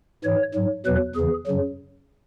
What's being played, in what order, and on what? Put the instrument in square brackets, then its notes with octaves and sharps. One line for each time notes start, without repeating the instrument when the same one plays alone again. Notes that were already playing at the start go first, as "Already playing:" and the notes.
[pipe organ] G#2 E3 C#5
G#2 F#3
E2 B2 F#3 B4
E2 C#3 E3 G#4
F#2 C#3 F#3